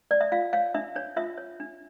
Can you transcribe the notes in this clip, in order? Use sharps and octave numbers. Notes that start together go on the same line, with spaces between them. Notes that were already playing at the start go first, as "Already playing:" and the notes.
D5
E5
F4 F5
C#5 F5
D4 E5
D4 C#5
F4 E5
C#5
D4